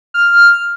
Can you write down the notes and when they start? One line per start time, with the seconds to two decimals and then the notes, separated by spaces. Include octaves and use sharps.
0.14 F6